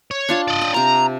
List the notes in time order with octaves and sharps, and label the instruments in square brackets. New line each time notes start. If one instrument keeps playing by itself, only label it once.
[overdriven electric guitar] C#5
[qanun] D4 F4 A5
[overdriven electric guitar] D5 D#5
[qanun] G5
[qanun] C3 A5 [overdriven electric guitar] A#5